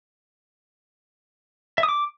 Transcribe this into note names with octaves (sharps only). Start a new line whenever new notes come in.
E5
D#6
D6